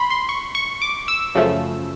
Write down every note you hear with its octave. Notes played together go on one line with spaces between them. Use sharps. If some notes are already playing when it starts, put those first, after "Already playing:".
Already playing: B5 C6
C6
C#6
C#6
D6
E6
F#2 C#3 F3 A3